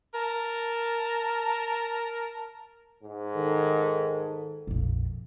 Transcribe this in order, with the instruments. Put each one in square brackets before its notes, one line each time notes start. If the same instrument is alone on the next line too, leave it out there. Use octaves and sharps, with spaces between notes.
[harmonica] A#4 A5
[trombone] G#2
[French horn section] D#3 A4
[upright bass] A#1 F2